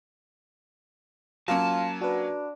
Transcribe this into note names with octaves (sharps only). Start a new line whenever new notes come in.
F#3 A#3 C#4 F4 A5
D4 F#4 B4